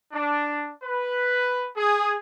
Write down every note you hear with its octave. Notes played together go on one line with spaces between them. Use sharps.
D4
B4
G#4